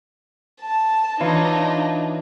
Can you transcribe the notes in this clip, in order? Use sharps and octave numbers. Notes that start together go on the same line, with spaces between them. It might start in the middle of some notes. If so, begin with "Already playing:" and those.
A5
E3 D4 D#4 F4 C#5